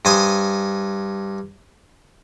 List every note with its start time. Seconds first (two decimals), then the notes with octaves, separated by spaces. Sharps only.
0.05 G2 C5 G#5 D#6